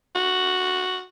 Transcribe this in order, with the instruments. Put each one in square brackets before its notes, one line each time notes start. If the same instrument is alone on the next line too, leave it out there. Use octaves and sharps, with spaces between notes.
[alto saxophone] F#4